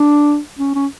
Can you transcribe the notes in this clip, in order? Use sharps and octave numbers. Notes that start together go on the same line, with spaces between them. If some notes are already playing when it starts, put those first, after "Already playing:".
Already playing: D4
C#4
C#4